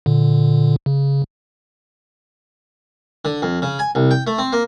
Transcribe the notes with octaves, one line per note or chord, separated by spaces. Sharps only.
A#2 D3
C#3
D3
F2
C#3
G#5
C2
G5
A3
C4
A#3